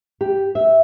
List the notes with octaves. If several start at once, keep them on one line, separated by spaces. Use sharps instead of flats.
G4
E5